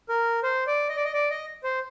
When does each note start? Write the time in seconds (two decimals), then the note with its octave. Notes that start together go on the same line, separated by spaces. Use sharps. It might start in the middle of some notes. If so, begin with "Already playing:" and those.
0.09 A#4
0.43 C5
0.67 D5
0.89 D#5
0.96 D5
1.05 D#5
1.13 D5
1.30 D#5
1.64 C5